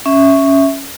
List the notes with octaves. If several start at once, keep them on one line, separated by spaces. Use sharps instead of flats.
C#4 E5